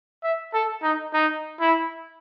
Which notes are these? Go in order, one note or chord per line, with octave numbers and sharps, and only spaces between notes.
E5
A4
D#4
D#4
E4